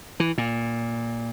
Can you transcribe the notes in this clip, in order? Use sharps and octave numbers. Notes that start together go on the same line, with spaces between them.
E3
A#2